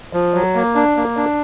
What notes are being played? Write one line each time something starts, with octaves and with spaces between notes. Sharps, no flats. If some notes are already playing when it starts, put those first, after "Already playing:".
F3
F#3
A#3
D4
A#3
D4